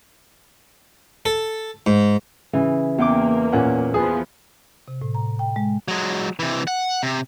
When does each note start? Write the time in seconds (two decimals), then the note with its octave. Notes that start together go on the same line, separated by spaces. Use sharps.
1.26 A4
1.87 G#2
2.53 C#3 E3
2.98 E2 A#3 G5 D6
3.52 A#2 C#4 F#5
3.94 F3 B3 G#4
4.88 C3
5.02 A2
5.15 A#5
5.39 G5
5.56 G#3
5.88 F#3 G#3
6.39 C3 E3
6.67 F#5
7.03 C3